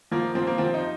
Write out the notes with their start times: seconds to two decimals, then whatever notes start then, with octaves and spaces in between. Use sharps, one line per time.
0.11 F3 A#3
0.35 F3 C4
0.47 A#3
0.58 F3 C4
0.74 D#4